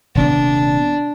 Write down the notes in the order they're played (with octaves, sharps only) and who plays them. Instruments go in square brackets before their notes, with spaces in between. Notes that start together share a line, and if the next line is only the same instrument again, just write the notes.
[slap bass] D#1 C3 B3 [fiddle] D4